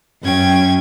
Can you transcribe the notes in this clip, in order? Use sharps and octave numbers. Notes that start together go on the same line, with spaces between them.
F#2 C#4 G5 G#6